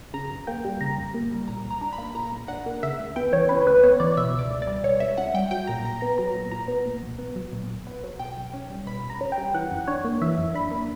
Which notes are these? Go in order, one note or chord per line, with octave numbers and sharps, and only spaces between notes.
C#3 A#5
F#2
A#3 G5
G3
C#3 A#5
F#2
A#3
G3
A#2 A#5
B1
A#5
D4
B5
A#3
A#2 A#5
B1
D4 F#5
A#3
C#3 E5
D2
B3 G5
E3 C#5
C#3 B4
D2 B4
B3 C#5
E3 D5
B2 E5
C#2
D5
C#2
D5
G3
B2 C#5
C#2 E5
C#2 F#5
G3 G5
F#3 G5
A#2 A#5
A#2 A#5
B3 A#5
F#3 A#5
A#2
A#2 A#5
B3
A#2
B1
B3
F#3
A#2
B1
B3
F#3
B2 G5
B1
C#4
G3
B2 B5
B1
A#5
C#4
G5
G3
E3 F#5
F#2
D4 C#5
A#3
E3 E5
F#2
D4 B5
A#3